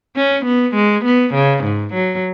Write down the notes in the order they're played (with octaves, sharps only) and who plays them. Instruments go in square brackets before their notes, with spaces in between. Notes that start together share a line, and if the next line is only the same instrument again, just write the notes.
[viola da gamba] C#4
B3
G#3
B3
C#3
G#2
F#3